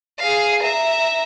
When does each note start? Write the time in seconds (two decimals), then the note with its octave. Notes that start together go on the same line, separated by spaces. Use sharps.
0.20 G#4 F5
0.63 E5 A#5